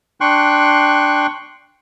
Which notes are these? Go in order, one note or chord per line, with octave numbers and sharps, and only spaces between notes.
D4 G5 C6 C#6 F#6